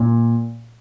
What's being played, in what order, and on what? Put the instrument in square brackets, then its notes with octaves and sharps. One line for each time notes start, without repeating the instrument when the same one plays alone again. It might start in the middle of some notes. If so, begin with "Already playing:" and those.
Already playing: [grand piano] A#2